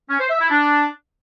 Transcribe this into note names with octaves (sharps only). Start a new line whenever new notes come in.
C#4
C5
E5
E4
D4